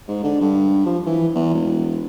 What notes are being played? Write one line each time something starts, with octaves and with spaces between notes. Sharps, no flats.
G#2
D3
G2
F3
E3
E2
E1